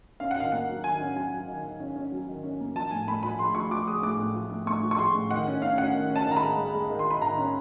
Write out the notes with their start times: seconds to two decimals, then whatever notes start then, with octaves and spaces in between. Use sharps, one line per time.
0.20 C#4 F5
0.31 F#5
0.37 D#3 F5
0.52 A#3 F#5
0.69 F#3
0.84 D#3 G#5
1.00 C#4
1.16 F#3 G#5
1.32 F#3
1.48 D#3
1.64 D#3
1.80 C#4
1.96 C#4
2.12 F#3
2.28 D#3
2.43 C#4
2.60 A#3
2.75 F3 A5
2.91 A2 G#5
3.07 A2 B5
3.23 F3 B5
3.39 G#3 C6
3.55 F3 C#6
3.71 F3 D6
3.87 G#3 D#6
4.03 A2 D6
4.19 A2
4.35 F3
4.52 A2
4.66 A2 C#6
4.83 F3
4.91 C#6
4.99 G#3 C6
5.15 A2
5.31 D#3 F#5
5.47 C#4
5.62 C#4 F5
5.78 C#4 F#5
5.94 D#3
6.10 C#4
6.16 A5
6.26 D#3
6.31 A#5
6.37 B5
6.42 G#3
6.58 G#3
6.74 G#3
6.90 D#3
6.99 C6
7.06 D#3 B5
7.22 D#3 A#5
7.38 C#4